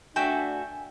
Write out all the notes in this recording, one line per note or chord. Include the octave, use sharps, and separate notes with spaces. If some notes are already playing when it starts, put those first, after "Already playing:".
A3 D4 F#4 E5 G5 G#5